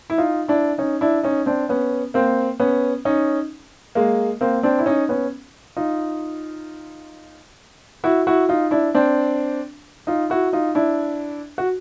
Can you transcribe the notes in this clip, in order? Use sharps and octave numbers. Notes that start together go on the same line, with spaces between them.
E4
D#4 F4
D4 E4
C#4 D#4
D4 E4
C#4 D#4
C4 D4
B3 C#4
A#3 C4
B3 C#4
C#4 D#4
G#3 A#3
A#3 C4
C4 D4
E4
C#4 D#4
B3 C#4
D#4 F4
E4 F#4
E4 F#4
D#4 F4
D4 E4
C4 D4
D#4 F4
E4 F#4
D#4 F4
D4 E4
F#4